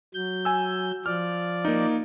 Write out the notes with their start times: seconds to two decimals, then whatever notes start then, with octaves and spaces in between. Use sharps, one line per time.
0.14 F#3 G6
0.45 G#5 E6
1.06 F3 D5 F6
1.65 A#3 D#4